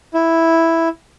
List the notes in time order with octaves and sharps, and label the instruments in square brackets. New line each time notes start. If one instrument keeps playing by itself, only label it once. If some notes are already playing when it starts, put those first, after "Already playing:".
[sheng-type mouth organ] E4